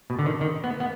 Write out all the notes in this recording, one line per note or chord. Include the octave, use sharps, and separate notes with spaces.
B2
D3
D#3
D#3
B3
B3